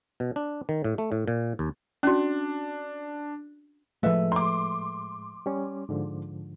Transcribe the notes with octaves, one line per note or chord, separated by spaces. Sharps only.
B2
D4
D#3
A2
A3
A2
A#2
D#2
C#4 D4 F#4
A2 F3 G#3 A3 A4 B4 E5
C6 D6
G3 C#4
G#2 D3 F3